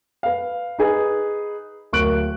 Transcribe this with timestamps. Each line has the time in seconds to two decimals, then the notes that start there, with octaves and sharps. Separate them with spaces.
0.23 B4 F5
0.79 D#4 G#4 B4
1.93 D1 A#3 C#6 F#6 D7 F#7